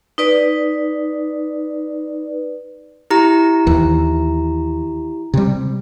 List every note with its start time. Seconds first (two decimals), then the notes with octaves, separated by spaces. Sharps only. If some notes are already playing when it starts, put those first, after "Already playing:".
0.18 D#4 B4 D5
3.10 E4 G4 A#5
3.67 D#2 E3
5.34 C3 G3